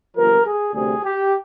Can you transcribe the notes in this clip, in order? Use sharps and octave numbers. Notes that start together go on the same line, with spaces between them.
G1 G2 F3 A#4
G#4
D2 C3 G3 C4 G#4
G4